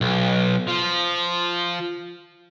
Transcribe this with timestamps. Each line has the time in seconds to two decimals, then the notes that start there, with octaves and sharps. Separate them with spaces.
0.01 B1
0.68 F3